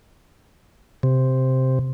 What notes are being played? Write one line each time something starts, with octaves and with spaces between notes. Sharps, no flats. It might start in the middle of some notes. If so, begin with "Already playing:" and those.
C3